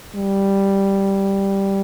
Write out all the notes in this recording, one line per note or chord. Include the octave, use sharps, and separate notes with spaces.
G3